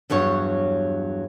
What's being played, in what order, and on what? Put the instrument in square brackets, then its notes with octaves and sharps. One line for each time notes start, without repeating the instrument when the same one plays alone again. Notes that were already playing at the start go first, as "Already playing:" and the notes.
[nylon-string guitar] E2 G2 F#3 C#5